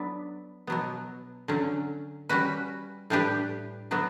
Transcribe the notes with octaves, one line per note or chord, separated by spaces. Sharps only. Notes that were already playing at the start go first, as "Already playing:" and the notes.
Already playing: F#3 B3 D4 B4
B2 F#3 B3
D3 F#3 C#4
G3 C#4 F#4 B4
A2 G3 D4 G4 B4
D3 F#3 B3 F#4